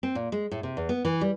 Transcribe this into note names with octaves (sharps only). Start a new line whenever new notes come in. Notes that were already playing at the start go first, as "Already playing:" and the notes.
C4
A#2
G#3
A2
C3
E2
B3
E3
G3